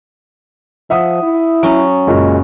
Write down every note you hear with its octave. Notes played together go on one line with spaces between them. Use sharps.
F3 E5 F#5 D#6
E4
F#3 C#4
F#1 A#2 G#3 F#4